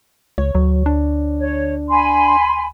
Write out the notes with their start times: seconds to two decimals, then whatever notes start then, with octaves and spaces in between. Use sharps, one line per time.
0.38 C#2 C#5
0.55 D2 F#3
0.86 D4
1.39 C#5
1.89 G#5 B5 C6